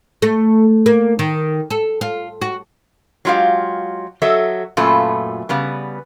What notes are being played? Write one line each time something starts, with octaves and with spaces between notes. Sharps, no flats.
A3
A#3
D#3
A4
F4
F#4
F#3 G#3 F4 G4 F5
F#3 A4 D#5 E5
F#2 A#2 A3 F4 B4 A5
C#3 G3 B3